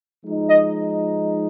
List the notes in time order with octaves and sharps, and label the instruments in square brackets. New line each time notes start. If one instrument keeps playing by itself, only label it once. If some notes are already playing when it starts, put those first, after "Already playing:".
[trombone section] F3 G#3 D#4
[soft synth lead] D#5